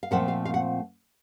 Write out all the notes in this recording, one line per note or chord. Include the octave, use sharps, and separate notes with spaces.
F5
A#2 F3 A3 C4 F#5
F5
F5
F#5